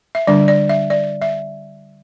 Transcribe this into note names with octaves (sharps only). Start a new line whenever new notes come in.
E5
D3 G3 D4 D5
D5
E5
D5
E5